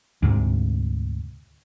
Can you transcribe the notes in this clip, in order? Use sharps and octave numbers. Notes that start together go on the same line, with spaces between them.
D2 G#2 C3